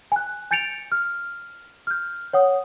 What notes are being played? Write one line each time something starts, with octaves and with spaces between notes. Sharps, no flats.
G#5 F#6
G#5 G6 A6 C#7 D7 F7
F6
F6 G6
C#5 F#5 D#6